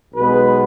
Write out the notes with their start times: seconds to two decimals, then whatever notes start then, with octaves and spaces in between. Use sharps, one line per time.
0.14 B1 B2 G#3 B3 B4